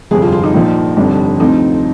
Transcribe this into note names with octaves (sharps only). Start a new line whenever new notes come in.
G1 F2 C3 G#4
F4
F4
D#4
A#1 A#2 F3
G1 F2 C3 G3 D4
D2 C3 F3 C4 D#4